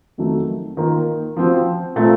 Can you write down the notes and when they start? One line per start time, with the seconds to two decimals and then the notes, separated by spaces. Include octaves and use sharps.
0.18 F2 D#3 F#3 A3
0.77 D#3 A#3 F4
1.36 F3 C4 F#4
1.96 A#2 A3 C4 F4